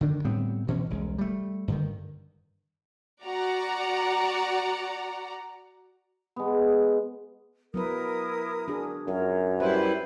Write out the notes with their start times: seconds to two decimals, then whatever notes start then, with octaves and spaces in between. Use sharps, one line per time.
0.01 D3 D#3 D4
0.24 A2 G3 B3 C4
0.67 D2 B2 E3 C#4
0.90 E1 C2 G#3
1.18 G3 A3
1.68 G2 D3 D#3
3.25 F#4 D5 F#5 A#5
6.36 G#3 B3
7.74 F#3 B3 E4 A#4 B4 D#6
8.68 D4 F#4 G#4
9.07 F#2 F4 A#4 C#5
9.60 G3 E4 B4 C5